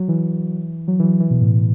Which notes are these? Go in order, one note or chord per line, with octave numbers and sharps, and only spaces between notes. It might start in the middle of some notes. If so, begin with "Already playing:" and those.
Already playing: F#3
E3
F#3
E3
F#3
E3
B2
A2